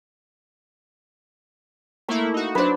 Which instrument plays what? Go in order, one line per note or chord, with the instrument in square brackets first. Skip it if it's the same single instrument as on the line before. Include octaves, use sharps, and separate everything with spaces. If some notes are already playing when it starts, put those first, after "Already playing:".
[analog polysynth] A3 A#3 E4 [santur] C#6
[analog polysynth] D#4 F#4
[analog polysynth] F#3 D4 [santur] B4 C5